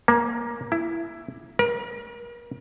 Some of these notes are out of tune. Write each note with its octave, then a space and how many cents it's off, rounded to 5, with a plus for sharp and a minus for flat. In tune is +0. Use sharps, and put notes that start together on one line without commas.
A#3 +20
E4 +15
A#4 +40